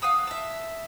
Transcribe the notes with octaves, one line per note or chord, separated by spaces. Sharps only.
F5 F#5 D#6 E6
E5 A5